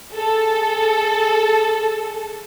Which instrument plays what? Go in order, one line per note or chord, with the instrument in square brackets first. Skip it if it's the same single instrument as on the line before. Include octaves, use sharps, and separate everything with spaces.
[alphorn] G#4 [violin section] A4